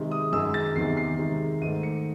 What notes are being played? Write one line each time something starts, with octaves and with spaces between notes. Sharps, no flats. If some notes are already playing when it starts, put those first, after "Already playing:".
Already playing: C3 D#3 G#3
D#6
F#2 D#3 G#3 E6
A6
E2 C3 D#3 C7
C7
C3 D#3 G#3
G#2 D#3 A3 D#7
C#7